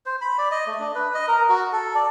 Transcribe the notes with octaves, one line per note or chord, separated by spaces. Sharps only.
C5
B5
D5
D#5
A3
D4
B4
D#5
A#4
F#4
A4
D5